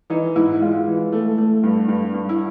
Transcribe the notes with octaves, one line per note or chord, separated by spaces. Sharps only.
E3 D#4
G#2 E4
G#3 F4
E3
A3
A3
G2
G2
G2
E4